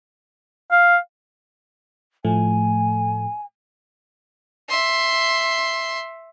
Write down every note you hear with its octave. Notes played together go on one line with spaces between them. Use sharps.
F5
A2 F3 A3 G#5
E5 C6